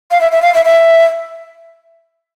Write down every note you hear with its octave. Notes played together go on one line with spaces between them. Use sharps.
F5
E5
E5
F5
E5
E5